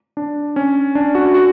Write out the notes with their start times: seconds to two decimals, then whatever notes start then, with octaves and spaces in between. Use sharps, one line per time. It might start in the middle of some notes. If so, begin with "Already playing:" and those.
0.17 D4
0.56 C#4
0.95 D4
1.15 F#4
1.34 F#4